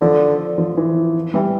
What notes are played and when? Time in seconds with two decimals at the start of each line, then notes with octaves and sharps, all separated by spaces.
0.01 D3 F3
0.58 F3
0.77 E3
1.34 E3 G3